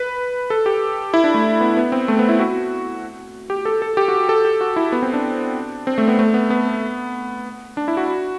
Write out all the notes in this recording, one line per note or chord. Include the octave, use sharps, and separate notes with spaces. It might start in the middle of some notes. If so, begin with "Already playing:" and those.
Already playing: B4
A4
G4
E4
D4
A3
B3
B3
C4
A3
B3
E4
F#4
G4
A4
A4
G4
F#4
A4
G4
F#4
E4
B3
C4
D4
C4
A3
B3
A3
B3
B3
D4
E4
F#4